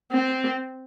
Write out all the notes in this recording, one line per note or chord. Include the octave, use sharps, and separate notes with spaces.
C4